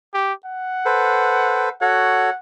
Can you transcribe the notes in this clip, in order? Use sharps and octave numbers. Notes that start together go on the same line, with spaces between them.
G4
F#5
A4 B4 C5
F#4 A4 C#5 F#5